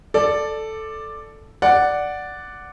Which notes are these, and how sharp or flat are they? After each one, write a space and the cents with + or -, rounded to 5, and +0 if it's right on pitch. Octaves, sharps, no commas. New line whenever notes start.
A4 +0 D5 +10
D5 +0 F#5 +0